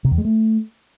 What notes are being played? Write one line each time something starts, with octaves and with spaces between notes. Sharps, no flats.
C3
E2
G#3
A3